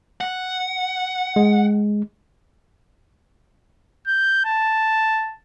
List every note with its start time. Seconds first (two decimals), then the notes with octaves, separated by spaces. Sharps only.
0.21 F#5
1.36 G#3
4.07 G6
4.45 A5